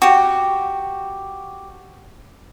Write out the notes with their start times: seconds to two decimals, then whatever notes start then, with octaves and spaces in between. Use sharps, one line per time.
0.02 F#4 G4